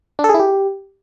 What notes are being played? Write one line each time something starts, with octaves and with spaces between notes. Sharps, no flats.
D4
A4
G#4
E4
G4